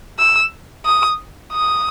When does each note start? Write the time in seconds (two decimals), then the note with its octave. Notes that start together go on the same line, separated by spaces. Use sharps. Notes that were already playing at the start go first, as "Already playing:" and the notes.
0.19 E6
0.85 D#6
1.52 D#6